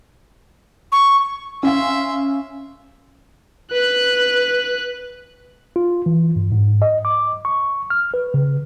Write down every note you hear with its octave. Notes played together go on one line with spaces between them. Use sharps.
C#6
C#4 E5 F5 C6
B4 F#6
F4
E3
G2
G#2
D#5
D6
C#6
F6
B4
C#3